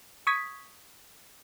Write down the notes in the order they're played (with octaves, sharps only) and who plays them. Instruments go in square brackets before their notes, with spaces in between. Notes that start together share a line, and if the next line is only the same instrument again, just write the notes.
[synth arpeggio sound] C#6 D#6 G#6 B6